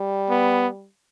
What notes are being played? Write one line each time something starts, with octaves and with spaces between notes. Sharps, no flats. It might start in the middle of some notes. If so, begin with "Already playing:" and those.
Already playing: G3
B3